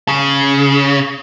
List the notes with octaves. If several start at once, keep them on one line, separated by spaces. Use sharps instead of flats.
C#3